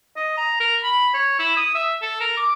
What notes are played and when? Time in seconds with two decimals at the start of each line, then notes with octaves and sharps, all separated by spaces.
0.16 D#5
0.37 A#5
0.60 A#4
0.83 B5
1.14 C#5
1.39 E4
1.57 D#6
1.75 E5
2.02 A4
2.21 A#4
2.37 D6